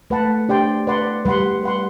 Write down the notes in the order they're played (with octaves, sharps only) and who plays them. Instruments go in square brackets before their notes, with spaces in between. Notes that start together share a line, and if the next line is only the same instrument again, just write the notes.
[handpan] A3 [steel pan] B4 F#5 A5
[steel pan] D4 G4 D5 G5 C6
B4 D5 F#5 C6
[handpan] G3 [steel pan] B4 F#5 C6
[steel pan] B4 F#5 C6